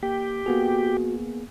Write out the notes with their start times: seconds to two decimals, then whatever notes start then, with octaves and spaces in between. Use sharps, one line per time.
0.03 A#3 G4
0.46 A#3 B3 F#4 G#4